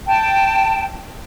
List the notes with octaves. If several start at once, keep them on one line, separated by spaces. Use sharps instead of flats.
G5 A5